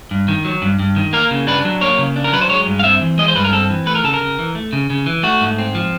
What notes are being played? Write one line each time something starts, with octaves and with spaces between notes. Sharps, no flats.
G2
D#3
F#3
G2
G2
D#3
A#3 A#4
C#3
D4 B4
F#3
A#3 C#5
C#3
D4
A#4
F#3 B4
C5
G#3 C#5
G2
F5
C4 E5
E3
G#3 D#5
C5
G2 B4
A#4
C4 A4
E3
A3 B4
A#4
C#3 A4
A#4
C#3
E3
A3
C#3
C#3
E3
A3 F#4
G#2
C4
F3